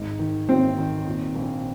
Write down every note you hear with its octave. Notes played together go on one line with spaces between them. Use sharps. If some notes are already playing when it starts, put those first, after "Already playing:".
Already playing: G#1 G#3 D#4
D#3
G#1 C4
D#3
A#2
A#1